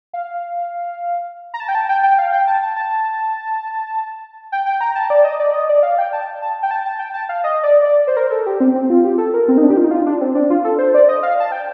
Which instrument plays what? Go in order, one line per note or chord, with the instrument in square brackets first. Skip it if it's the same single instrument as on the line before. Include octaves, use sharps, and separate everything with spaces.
[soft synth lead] F5
A#5
A5
G5
A5
G5
G5
F5
G5
A5
A5
A5
G5
G5
A#5
A5
D5
D#5
D5
D#5
D5
F5
G5
A5
A5
G5
A5
A5
G5
A5
F5
D#5
D5
D5
C5
A#4
A4
G4
C4
C4
F4
G4
A4
A#4
C4
D#4
D4
G4
F4
D#4
F4
D4
C4
D4
F4
A4
C5
D5
D#5
F5
A5
G5